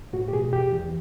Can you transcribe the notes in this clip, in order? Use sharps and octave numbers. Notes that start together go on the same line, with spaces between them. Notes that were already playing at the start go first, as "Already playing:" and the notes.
A2 F#4
G4
B2 G#4
E2 G4
E2